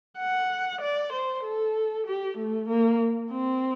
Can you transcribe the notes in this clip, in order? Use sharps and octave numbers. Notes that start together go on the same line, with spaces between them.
F#5
D5
C5
A4
G4
A3
A#3
C4